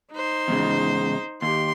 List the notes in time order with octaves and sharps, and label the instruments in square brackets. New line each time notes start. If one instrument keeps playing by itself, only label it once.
[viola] D#4 C5
[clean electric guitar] E2 G#2 C#3
[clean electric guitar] D#2 [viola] G4 C6